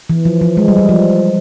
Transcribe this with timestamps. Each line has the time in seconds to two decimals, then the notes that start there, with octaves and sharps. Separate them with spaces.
0.10 E3
0.25 F3
0.41 F3
0.57 G#3
0.68 G3
0.78 G3
0.89 F3